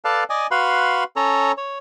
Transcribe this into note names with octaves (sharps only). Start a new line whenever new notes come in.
A4 B4 D5 F5 A5
D5 D#5 G#5
F#4 B4 F5 B5 C6
C#4 A4 C#5 A#5
C#5